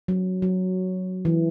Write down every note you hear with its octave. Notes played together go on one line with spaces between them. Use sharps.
F#3
F#3
E3